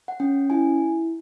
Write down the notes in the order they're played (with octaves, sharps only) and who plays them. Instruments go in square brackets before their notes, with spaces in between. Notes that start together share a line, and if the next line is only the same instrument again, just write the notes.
[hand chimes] F#5
C#4 G5
E4 G#5